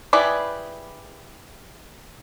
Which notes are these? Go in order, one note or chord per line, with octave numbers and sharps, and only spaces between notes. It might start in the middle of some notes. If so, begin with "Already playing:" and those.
E4 G4 G#4 B4 D5